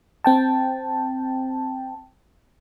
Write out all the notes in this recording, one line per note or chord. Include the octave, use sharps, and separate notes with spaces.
C4 G5 A5